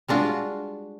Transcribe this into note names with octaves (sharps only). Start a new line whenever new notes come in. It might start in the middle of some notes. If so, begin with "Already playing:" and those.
G3 G#3 D4 F4 F#4